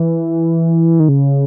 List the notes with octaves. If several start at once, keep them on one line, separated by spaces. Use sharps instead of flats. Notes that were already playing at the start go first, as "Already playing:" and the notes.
Already playing: E3
D#3
C#3